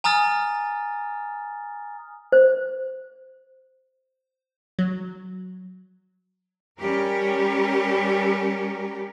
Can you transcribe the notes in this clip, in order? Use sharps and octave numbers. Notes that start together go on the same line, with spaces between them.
G#5 A#5 D#6 F6 A6
C5
F#3
G3 C#4 G4 A#4